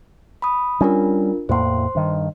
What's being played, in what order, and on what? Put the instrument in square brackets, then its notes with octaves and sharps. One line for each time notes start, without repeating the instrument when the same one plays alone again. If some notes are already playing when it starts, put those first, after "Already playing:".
[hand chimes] B5 D#6
[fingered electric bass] G3 C#4 [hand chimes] D4 F4 A#4
[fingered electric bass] E2 A2 A#3 [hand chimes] C5 C6
[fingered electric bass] G2 D#3